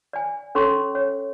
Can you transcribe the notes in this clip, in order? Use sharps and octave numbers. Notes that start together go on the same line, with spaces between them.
D5 G#5
C#4 A4 C#5 C6 C#6
C#5